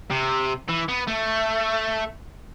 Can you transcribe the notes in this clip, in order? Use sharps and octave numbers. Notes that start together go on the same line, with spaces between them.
C3
E3
B3
A3